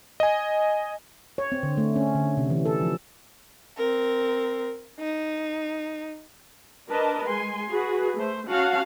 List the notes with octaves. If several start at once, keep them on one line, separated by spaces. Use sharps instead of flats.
D#5 G#5
C#5
C4
D3
A3
C#4
D3
C3
E3
A4
F3
C4 A#4
D#4
D4 A#4 B4 D#5 A5
G#3 G#5 C6
F#4 G#4 B4
A3 C5
C#4 F#4 F5 F#5 A5